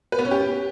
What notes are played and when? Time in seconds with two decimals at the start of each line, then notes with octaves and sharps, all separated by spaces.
0.12 B4
0.19 B3
0.25 C#4
0.31 G4